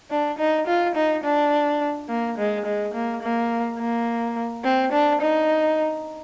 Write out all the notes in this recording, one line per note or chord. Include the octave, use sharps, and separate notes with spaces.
D4
D#4
F4
D#4
D4
A#3
G#3
G#3
A#3
A#3
A#3
C4
D4
D#4